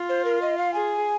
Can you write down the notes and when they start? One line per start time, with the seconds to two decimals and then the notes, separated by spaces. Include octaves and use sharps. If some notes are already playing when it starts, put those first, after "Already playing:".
Already playing: F4
0.09 C5
0.25 A#4
0.42 D#5
0.58 F5
0.74 G#4 G#5